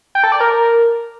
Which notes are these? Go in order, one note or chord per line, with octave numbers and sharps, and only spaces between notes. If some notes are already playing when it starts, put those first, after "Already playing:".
G5
A4
D5
A#4